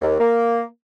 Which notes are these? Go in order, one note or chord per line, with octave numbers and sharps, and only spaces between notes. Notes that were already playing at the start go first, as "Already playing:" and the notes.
D#2
A#3